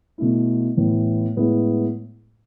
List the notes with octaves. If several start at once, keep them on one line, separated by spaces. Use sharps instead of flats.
B2 A3 E4
A2 E3 B3 E4
A2 G#3 B3 E4